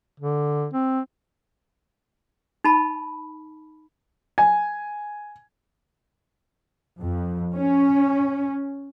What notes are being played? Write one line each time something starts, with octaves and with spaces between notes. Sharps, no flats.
D3
C4
D#4 A5 B5
G#5
F2
C#4